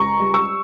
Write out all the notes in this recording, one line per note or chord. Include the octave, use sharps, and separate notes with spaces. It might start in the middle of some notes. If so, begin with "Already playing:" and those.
Already playing: C#2 A#5 C#6
G3
C#6 E6